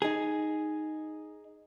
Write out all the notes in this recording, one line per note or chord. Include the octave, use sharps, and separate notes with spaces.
D#4 G#4